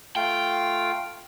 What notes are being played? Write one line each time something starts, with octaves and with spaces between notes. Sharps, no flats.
A3 F4 F5 G5